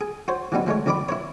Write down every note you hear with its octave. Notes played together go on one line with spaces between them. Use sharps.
G#4
F#4 C5 C#5
E3 F#3 G3 B3 D#4
F3 G#3 A3 C#5
F2 D#3 D5 A#5 B5 D6
E4 B4 C#5